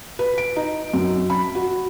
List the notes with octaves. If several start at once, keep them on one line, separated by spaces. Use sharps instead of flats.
B4
D7
D#4
F#2
B5
F#4